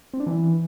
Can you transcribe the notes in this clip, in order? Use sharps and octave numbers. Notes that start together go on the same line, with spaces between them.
C4
D4
E3